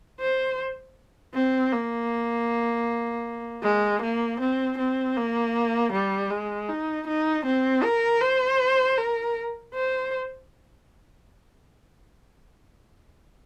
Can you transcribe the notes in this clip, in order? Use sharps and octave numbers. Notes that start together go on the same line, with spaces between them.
C5
C4
A#3
G#3
A#3
C4
C4
A#3
G3
G#3
D#4
D#4
C4
A#4
C5
A#4
C5